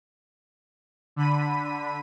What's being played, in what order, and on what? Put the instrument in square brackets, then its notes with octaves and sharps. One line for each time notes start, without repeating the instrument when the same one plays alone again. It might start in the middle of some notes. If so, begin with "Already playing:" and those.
[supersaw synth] D3 B5 D#7